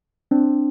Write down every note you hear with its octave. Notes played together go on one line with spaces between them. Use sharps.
C4 D4